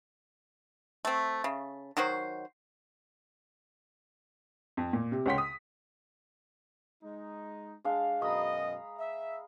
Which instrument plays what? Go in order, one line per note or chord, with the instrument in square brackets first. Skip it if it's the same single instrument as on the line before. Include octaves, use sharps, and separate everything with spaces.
[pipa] A3 C4
C#3
D#3 F#3 F#4 C5
[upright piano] F2
A#2
C3
C#2 C#4 F#5 G5 C6 B6
D#6
[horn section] G#3 D#4
[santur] G#3 D4 F5
[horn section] F#2 B2 D#5 [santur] A#5 B5 D#6
[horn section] E5